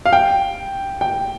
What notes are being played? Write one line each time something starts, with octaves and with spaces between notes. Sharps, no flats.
F5
G5
G5